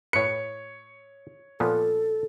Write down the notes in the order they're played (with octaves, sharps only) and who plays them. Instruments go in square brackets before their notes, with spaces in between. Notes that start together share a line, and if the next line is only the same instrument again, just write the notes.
[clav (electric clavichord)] A2 B4 [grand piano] C#5 C#7
[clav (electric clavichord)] A#2 F3 B3 [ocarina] A4